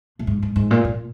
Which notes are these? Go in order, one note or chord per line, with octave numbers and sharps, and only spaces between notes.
A#2
G#2
G#2
G#2
A#2
A#2